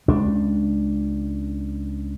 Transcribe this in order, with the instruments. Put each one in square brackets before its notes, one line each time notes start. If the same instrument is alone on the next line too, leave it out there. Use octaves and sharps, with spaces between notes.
[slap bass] C#2 D4